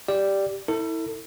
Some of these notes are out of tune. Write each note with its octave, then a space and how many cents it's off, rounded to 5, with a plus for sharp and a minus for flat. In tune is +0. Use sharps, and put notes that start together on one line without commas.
G4 +0 D5 +0
E4 -20 A4 +35